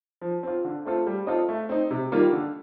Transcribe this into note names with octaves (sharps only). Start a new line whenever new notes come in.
F3
C4 F4
D3
A3 C4 F4 A4
G3
C4 F4 A4 D#5
A3
C4 D#4
C3
D#3 G3 A#3 F4
D3